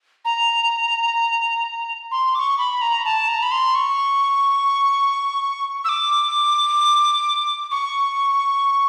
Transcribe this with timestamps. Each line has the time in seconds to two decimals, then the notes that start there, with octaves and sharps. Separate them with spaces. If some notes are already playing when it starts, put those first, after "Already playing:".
0.25 A#5
2.11 C6
2.35 D6
2.39 C#6
2.58 B5
2.81 A#5
3.05 A5
3.28 A#5
3.42 B5
3.51 C6
3.75 C#6
5.84 E6
5.89 D6
7.71 C#6